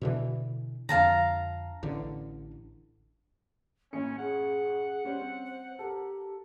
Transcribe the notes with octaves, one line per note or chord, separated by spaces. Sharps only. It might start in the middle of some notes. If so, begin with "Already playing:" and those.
B2 D3 E3
F2 D3 F5 A5 A#5
A1 D3
A1 F#2 A#3 C#4 C#7
G#4 F#5
G3 C#4 C5
C4
C5
G4 A4 A#4